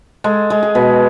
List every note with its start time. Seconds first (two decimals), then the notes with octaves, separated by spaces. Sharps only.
0.24 G#3 A4
0.50 G#3
0.63 G#4
0.75 B2